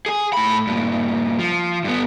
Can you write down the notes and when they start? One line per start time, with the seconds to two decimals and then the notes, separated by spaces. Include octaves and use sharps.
0.06 G#4 G#5
0.33 A2 B5
0.67 G2 A#2
1.39 F3
1.84 G2 B3